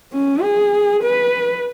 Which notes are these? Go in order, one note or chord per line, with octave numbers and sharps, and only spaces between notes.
C#4
G#4
B4